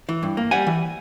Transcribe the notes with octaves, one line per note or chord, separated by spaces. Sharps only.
E3
G2
A#3
G3 F#5 G#5
E3